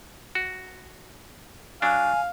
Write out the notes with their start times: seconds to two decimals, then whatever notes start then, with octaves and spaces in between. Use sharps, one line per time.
0.35 F#4
1.82 F#3 D4 F5 G#5